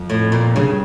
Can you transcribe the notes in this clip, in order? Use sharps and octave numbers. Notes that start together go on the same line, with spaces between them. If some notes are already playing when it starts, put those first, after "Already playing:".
Already playing: F2
A2
A#2
G2 C#3